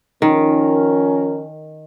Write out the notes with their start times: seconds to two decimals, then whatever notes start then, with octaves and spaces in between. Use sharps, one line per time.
0.22 D#3 F3 C#4 A#4